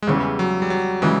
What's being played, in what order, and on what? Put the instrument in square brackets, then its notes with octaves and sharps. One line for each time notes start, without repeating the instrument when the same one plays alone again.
[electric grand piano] G#3
[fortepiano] E2 C#3 E3 [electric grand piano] G3
[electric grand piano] F#3
G3
F#3
[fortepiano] C#3 E3 [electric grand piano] G#3